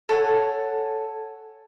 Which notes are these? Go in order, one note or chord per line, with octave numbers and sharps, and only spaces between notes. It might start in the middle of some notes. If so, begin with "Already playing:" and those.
A4 C#5 F#5 G#5